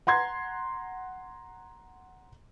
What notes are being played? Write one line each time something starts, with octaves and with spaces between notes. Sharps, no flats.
F#5 A#5 C6 G#6